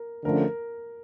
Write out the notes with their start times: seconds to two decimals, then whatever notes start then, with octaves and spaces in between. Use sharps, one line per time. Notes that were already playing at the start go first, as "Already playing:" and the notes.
Already playing: A#4
0.24 D3 F3 A3 C#4 A#4